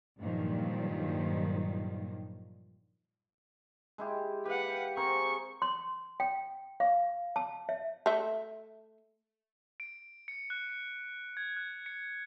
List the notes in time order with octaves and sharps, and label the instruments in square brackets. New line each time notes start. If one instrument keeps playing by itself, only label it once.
[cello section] G2 A#2 D#3 F3 F#3
[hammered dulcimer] G#3 E4 G4
[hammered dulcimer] G4 F5 [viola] B4 F#5
[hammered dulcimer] C4 G#4 A#4 [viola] C#6
[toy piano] C6
G5
F5
A5
E5
[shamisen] A3 E5
[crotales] D7
C#7
F#6
C#7
G#6
F#6
C#7